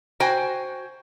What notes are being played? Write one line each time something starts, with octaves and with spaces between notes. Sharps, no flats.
F#4 C5 G5 G#5